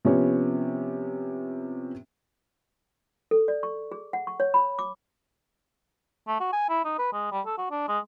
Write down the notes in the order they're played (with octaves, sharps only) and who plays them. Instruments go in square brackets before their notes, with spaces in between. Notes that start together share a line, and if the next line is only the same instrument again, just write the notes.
[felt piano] C3 F3 B3 C#4 C#5
[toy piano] A4
D5
C#6
G#4
F#5
C#6
C#5
B5
D6
[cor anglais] A3
F#4
G#5
E4
D#4
B4
G#3
G3
A4
F#4
D4
G#3